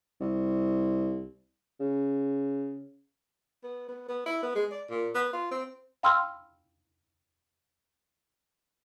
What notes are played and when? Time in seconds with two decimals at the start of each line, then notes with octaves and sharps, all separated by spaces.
0.21 C2
1.80 C#3
3.63 B3
3.89 B3
4.09 B3
4.26 E4
4.43 B3
4.55 G#3
4.72 D5
4.89 A#2
5.15 B3
5.33 F4
5.51 C4
6.03 F5 G5 B5 C6 E6 F6